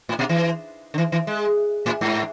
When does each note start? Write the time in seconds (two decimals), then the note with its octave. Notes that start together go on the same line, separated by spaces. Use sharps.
0.09 A2
0.19 B2
0.29 E3
0.94 D3
0.98 E3
1.12 E3
1.27 G#3
1.86 A2
2.01 G#2